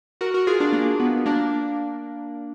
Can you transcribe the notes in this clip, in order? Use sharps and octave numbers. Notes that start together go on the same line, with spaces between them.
F#4 A#4
F#4 A#4
F4 G#4
D4 F4
A#3 D4
B3
A#3 D4